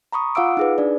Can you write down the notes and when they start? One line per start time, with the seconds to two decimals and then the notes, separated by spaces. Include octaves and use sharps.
0.12 A#5 B5 C#6 D#6
0.35 F4 F5 F#5 D6 E6 D7
0.57 D#4 G#4 B4
0.78 D4 D5